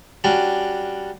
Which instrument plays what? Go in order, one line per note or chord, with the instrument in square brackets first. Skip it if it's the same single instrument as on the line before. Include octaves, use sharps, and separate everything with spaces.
[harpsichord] G3 C#4 D4 F#4